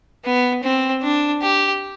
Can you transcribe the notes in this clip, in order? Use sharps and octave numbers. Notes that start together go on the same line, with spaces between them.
B3
C4
D4
G4